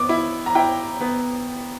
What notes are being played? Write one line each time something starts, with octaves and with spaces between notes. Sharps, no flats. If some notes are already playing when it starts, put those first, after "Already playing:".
Already playing: B3 D6
E4
A#5
E4 G5
B3